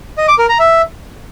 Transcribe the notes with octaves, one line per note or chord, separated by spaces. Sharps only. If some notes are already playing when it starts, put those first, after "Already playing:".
D#5
D6
A#4
A#5
E5